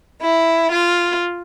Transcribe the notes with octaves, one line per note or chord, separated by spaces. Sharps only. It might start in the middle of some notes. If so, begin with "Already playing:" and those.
E4
F4